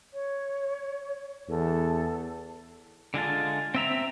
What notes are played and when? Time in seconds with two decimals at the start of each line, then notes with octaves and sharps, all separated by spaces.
0.13 C#5
1.49 E2 A4
3.14 D3 G#3 F4 A5
3.75 C4 E5 A#5